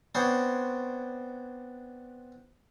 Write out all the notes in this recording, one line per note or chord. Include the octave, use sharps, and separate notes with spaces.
B3 C4 D4 C5 C#5